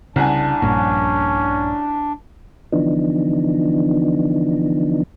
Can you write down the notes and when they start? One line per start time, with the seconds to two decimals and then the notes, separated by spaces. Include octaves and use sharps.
0.16 C2 C#3 D4 F#5 G#5
0.62 A#1 G2 A#2 C#4
2.72 D3 E3 F3 B3 D4 D#4